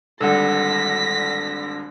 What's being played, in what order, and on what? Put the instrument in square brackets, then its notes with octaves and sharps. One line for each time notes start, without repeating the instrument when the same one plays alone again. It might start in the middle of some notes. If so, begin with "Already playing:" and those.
[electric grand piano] G#1 D3 G3 [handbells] A4 F#5 [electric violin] A#6 B6